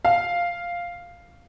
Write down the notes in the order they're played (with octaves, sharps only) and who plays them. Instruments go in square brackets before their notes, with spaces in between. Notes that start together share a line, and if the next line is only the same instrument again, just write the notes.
[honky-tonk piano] F5